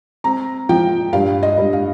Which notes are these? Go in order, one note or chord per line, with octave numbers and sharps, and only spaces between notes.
C4 A#5
F3 G5
G2 F5
D#5
G2
F5